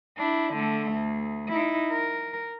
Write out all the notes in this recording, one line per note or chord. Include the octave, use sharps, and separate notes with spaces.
D4 E4
D3 A3
D2
D#4 E4
A#4